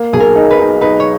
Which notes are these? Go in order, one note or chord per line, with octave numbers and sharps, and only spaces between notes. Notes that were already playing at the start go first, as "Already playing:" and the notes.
Already playing: A#3
B1 G#4
A#4
D#4
B4
D#4
D#4 B4
C#5